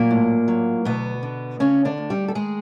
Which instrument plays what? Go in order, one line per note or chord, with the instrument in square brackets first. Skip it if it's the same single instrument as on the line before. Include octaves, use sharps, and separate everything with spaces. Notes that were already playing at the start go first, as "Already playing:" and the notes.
Already playing: [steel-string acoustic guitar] A#2 F#3 A#3
A2
F#3
D2 B2 B3
D3
D2 C#3 C#4
D3 D4
D2
G3 G4
A4
D#3 G#3 G#4